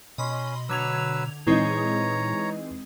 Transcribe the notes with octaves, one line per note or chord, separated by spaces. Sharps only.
B2 C#4 D#5 B5 C6
D3 F#3 B4 E6 G#6 F7
A#2 E3 G#3 C4 D#4 G#4 C#5 A#5